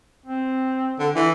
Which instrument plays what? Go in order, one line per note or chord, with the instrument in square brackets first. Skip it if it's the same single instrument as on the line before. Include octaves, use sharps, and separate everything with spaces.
[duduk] C4
[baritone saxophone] D3
E3